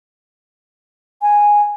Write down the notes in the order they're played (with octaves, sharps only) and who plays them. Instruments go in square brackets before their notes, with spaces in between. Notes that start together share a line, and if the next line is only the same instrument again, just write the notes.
[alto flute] G#5